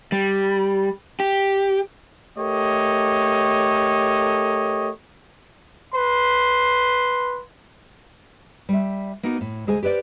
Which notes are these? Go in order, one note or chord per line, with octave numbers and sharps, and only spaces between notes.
G3
G4
A3 G4 A4 A#4 C#5 D#5
B4 C6
G3 E5
A#3 B3 D#4 F#4
A2
D2 G#3 G#4 C5 G#5
G4 B4 C5 D5